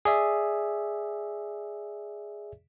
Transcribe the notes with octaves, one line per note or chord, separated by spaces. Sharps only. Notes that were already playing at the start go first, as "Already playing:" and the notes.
G#4 D5 E5